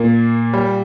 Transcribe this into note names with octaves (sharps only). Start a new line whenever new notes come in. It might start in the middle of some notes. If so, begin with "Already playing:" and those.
Already playing: A#2 A#3
G3